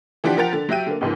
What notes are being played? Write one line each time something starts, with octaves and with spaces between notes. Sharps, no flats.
E3 F3 D4 G4 F#5 B6
F3 A#4 F#5 G5 A6 F7
D3 A6
F#3 G4 E5 G5 D#7
D3 A#3
C#2 G#2 F3 A#3